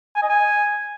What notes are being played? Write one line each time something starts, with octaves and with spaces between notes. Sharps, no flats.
G#5
D#5
G#5